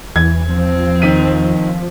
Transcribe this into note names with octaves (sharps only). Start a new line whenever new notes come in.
E2 E3 G#6
F3 C4
D#3 B6 D#7